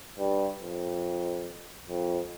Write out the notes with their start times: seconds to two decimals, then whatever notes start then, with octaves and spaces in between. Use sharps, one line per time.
0.18 G2
0.60 F2
1.89 F2